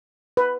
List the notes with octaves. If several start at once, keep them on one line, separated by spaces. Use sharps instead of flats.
B4